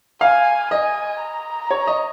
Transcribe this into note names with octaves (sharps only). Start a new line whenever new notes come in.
F5 G#5
D#5 G#5
A#5
C#5
D#5